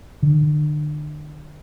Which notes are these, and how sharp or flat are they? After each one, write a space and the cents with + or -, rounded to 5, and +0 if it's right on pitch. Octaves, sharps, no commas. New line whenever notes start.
D3 +35